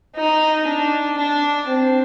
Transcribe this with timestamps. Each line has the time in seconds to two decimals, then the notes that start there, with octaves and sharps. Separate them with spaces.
0.16 D#4
0.67 D4
1.18 D4
1.70 C4